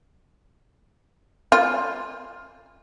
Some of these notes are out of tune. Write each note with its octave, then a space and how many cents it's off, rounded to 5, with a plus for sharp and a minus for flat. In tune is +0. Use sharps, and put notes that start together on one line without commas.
F4 +10